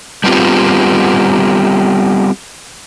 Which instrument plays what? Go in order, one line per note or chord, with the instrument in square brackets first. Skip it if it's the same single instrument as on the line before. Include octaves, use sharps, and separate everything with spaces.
[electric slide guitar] G3 B3 C4 F4 G4